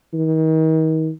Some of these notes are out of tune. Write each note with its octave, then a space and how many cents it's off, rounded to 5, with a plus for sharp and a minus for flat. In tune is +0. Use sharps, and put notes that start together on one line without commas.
D#3 +35